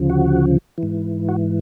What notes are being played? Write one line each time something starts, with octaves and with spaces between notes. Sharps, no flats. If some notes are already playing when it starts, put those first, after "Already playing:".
Already playing: D2 C#3 F3
F#4
G#2 E3
F#4